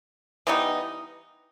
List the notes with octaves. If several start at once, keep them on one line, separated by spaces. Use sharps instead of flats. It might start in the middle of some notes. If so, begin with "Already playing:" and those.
E3 G3 B3 D#4